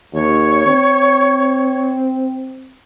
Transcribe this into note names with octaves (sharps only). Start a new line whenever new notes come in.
D#2 C#5
C4